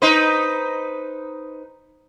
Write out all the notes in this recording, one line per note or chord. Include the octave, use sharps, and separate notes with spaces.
D#4 B4 C5